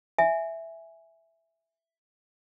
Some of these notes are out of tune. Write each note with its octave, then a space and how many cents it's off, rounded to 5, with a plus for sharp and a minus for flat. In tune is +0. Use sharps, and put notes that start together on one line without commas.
E5 +0 G#5 +0